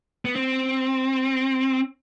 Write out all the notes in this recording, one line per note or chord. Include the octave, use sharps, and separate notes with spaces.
B3
C4